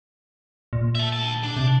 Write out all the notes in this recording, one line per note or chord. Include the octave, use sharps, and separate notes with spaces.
A#2
E5 A5
D2 A5
D4
C3